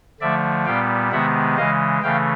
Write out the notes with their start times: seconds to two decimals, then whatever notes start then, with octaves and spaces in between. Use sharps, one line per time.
0.20 D3 F3 A3 D5 E5
0.66 A#2 G3 B3 F5 G5
1.12 C3 D#3 G#3 B3 E5 F#5
1.57 C#3 E3 G#3 D#5 F5
2.03 C#3 E3 A3 F5 G5